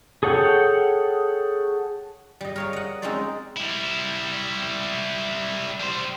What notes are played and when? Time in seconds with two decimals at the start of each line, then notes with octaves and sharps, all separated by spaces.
0.23 G#4 A4 C#5 F#5 G5
2.41 G3 D#5
2.56 A#4 C#5 F5
2.73 D#5 F#5
3.02 G#3 C4 C#4 D#4 C5 D5
3.57 G3 E4
5.80 G3 C5